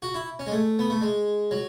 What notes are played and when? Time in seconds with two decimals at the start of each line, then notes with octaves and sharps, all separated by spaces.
0.02 F#4
0.14 E4
0.39 C#4
0.47 G#3
0.52 A3
0.79 B3
0.90 A3
1.01 G#3
1.51 F#3